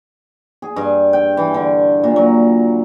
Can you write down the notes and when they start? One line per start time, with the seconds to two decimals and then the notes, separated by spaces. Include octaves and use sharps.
0.62 G#4
0.76 G2
1.13 G5
1.37 E3
1.54 D3
2.03 A#2
2.16 F#3